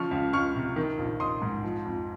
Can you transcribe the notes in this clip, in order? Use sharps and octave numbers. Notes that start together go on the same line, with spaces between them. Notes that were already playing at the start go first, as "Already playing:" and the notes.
Already playing: C#3 F3 C#6 F6
C#2
C#2 C#6 F6
C3
D#3
A#1
A#1 C6 D#6
G#2
F3
F2